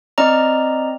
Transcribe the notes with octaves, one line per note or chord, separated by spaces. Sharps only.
C4 D5 D#5 A#5